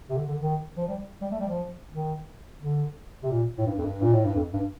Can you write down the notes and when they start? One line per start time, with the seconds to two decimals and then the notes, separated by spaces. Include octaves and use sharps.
0.10 C3
0.18 D3
0.29 D3
0.41 D#3
0.77 F3
0.88 G3
1.22 G3
1.32 A3
1.40 G3
1.48 F3
1.92 D#3
2.61 D3
3.23 C3
3.31 A#2
3.58 A2
3.67 G2
3.79 F2
3.84 G2
4.02 A#2
4.13 A2
4.25 G2
4.36 F2
4.53 G2